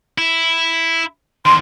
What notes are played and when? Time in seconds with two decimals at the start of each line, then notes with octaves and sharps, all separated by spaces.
0.18 E4
1.46 E2 D#3 C6